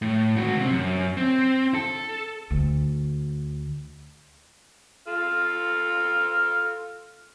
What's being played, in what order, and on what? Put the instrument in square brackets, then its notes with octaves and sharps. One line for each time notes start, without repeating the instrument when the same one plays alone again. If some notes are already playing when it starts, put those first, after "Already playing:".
[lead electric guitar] A2
G#2 F#4
C3 C4
F#2
C4
A4
[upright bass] D2
[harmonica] F4 A4 F6